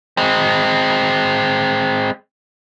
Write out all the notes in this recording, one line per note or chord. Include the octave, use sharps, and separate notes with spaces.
G#3 C4